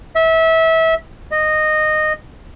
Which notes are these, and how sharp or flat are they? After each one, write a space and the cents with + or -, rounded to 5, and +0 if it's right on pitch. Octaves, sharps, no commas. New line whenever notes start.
E5 -25
D#5 -15